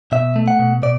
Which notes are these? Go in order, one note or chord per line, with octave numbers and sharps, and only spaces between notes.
B2 E5
A3
F#5
B2
B2 D5